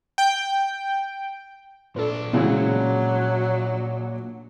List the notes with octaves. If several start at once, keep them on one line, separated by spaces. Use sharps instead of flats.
G5
A#2 D4 A4 B4
C#3 E3 F#3 G#3 B3 C#4